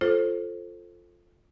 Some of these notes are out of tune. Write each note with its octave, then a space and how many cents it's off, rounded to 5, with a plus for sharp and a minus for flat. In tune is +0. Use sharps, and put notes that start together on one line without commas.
F4 +0 A4 +0 C5 +10